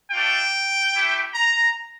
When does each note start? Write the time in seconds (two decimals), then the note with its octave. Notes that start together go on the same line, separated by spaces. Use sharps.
0.11 A3 D4 F4 G5
0.94 A3 E4 G4
1.34 A#5